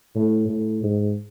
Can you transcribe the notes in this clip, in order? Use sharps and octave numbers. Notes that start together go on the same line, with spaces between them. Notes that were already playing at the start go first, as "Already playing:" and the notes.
A2
A2
G#2